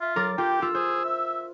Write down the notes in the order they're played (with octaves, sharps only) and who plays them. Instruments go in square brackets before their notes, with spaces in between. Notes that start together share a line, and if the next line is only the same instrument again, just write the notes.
[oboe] F4 [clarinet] E5
[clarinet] F#3 [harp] A#4 D6 A6
[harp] F4 [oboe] G4 [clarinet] G5
[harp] F4 [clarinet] E6
[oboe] G#4 [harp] C5
[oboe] E5